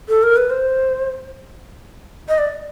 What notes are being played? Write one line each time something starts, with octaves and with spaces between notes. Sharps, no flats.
A4
A#4
B4
C5
D#5
D5